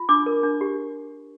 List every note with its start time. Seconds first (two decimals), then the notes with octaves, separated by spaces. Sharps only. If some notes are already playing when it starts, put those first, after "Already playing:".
Already playing: F4
0.09 D4 D6
0.26 A#4
0.43 D4
0.61 G4